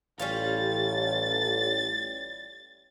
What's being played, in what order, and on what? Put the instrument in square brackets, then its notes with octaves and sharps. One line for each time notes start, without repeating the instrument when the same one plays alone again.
[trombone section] A1 [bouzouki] G3 C#4 F4 [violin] A6